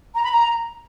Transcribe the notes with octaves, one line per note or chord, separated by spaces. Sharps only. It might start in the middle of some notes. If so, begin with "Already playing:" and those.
A#5
B5
A#5